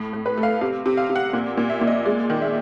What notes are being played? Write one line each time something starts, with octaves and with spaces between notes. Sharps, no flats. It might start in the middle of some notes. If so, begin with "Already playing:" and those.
Already playing: A2
A2
B4
A3
F5
C3 F5
C3
F5
C3
F#5
A#2
A#2
E5
A#2
D#5
G#3 D5
D#3
E5